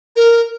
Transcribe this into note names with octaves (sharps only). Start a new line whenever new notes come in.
A#4